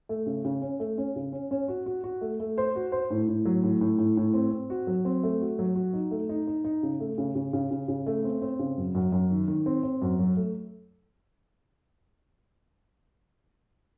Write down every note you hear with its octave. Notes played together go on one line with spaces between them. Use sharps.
A3
C#3
C#3
C#4
A3
C#4
C#3
C#4
C#4
F#4
F#4
F#4
A3
A3
C5
F#4
C5
A2
A2
F#3
A2
A2
A2
A2
C4
C4
F#4
F#3
C4
A3
F#4
F#3
F#4
D#4
A3
D#4
D#4
D#4
C#3
A3
C#3
C#3
C#3
C#3
C#3
A3
C4
C4
C#3
F#2
F#2
F#2
D#3
D#3
C4
C4
F#2
F#3
A3